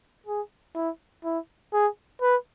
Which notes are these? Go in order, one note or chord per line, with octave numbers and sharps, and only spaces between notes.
G#4
E4
E4
G#4
B4